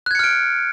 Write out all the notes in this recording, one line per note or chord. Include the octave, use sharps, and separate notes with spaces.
F6 F#6 G#6 C#7 D7